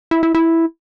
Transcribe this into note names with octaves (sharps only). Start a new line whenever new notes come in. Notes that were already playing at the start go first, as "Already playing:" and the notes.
E4
E4
E4